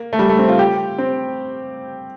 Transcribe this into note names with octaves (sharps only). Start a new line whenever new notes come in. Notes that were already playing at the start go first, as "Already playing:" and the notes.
Already playing: A#3
A3
G3
A3
C4
F4
G4
C4